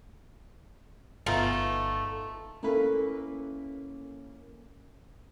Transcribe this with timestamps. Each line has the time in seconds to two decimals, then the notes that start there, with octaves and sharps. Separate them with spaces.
1.26 G1 A3 B3 D#4 F4
2.63 A#3 C#4 E4 A4 B4